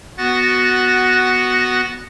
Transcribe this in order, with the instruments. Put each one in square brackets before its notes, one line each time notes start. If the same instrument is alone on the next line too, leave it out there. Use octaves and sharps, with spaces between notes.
[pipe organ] B3 F#4 F#5 F#6 A6 A#6